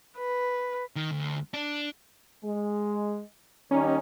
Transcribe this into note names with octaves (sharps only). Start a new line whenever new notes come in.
B4
D#3
D2
D4
G#3
D#2 G3 C#4 D#4